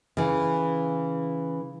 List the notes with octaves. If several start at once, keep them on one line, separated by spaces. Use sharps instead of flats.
C#3 E3